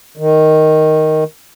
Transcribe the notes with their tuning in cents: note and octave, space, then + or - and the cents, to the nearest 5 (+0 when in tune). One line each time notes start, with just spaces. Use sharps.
D#3 +0